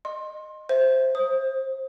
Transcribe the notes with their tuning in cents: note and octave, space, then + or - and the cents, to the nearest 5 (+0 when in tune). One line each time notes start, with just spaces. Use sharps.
D#5 -15 C6 +25
C5 +0 E5 +0
C5 +25 D#6 +10